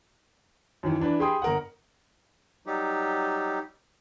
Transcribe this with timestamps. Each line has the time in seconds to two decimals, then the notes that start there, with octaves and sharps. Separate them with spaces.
0.83 F#2 D#3 E3
1.00 E3 D4 B4 D5
1.19 G4 G#4 G5 B5 C6 D#6
1.42 G1 A#4 F#5
2.66 F#3 G3 D#4 G4